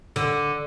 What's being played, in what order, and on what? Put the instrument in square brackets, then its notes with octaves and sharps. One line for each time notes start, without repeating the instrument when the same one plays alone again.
[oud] D3